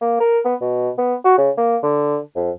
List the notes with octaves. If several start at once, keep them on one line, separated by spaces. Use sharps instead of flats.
A#3
A#4
B3
B2
B3
F#4
C#3
A#3
D3
F2